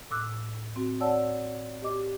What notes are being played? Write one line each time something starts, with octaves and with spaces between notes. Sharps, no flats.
A2 D6 E6 F#6
C4 F#4
C#5 D5 F#5 A5 E6
G4 D#5 D6